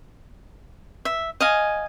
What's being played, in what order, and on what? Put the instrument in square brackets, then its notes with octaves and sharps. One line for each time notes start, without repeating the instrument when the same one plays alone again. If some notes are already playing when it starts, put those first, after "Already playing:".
[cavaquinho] E5
D#5 F5 G#5